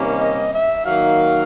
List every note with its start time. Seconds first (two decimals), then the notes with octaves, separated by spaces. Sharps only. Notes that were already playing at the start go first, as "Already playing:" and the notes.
Already playing: C3 D#3 G3 A#3 C#4
0.17 D#5
0.51 E5
0.85 D#3 F#3 A#3 D#4 F5